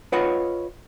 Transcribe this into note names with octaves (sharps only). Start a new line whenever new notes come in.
F4 B4 C#5 D#5 F#5